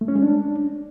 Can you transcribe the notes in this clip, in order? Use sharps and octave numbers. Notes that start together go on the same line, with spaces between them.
A3
C#4
G#3
D4